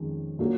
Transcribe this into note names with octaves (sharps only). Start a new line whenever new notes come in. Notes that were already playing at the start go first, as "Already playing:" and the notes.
Already playing: F2 D#3 G#3 C#4
A#2 F#3 A#3 C#4